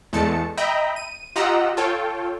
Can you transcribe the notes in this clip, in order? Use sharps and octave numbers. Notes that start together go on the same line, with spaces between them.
E2 G#3 A3 A5 C#7
D#5 E5 G5 A#5 B5
D#7
F4 G4 D#5 F#5 A#5 E6
F4 A4 C#5 G5